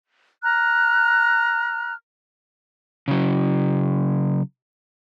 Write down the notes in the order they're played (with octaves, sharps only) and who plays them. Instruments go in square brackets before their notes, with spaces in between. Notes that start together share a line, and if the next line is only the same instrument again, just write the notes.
[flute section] A#5 F6 F#6
[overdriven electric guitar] C#3 F#3